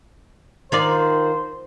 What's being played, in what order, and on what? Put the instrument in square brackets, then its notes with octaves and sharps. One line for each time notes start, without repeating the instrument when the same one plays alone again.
[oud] D#3 F4 D5 [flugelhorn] C5